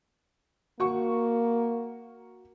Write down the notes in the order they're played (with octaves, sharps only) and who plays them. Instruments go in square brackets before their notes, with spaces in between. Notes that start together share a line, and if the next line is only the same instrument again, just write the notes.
[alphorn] A#3 [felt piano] F#4 C#6